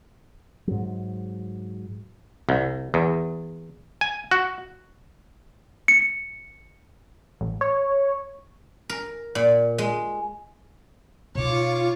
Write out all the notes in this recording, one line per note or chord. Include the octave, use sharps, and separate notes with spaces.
G#2 F#3
C2
E2
G#5
F#4
C#7
A1
C#5
A#4
A#2
G#3
B2 D#4 F4 C#5 D6